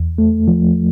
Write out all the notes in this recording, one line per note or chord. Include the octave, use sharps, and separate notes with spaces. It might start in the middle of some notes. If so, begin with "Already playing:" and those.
Already playing: E2
A3
F3